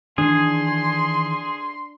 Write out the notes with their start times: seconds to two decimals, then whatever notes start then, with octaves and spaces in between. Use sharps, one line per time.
0.18 D#3 E3 D4 G#4 C6